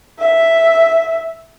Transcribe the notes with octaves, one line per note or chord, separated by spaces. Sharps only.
E5